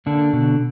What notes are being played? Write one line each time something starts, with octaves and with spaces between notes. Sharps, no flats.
D3 A#3 D4
B2